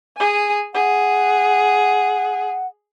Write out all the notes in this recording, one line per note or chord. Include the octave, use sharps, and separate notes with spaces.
G#4 G#5
G#4 F#5